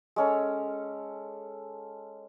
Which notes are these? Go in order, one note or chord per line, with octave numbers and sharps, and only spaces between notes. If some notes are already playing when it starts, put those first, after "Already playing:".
G#3 C#4 A4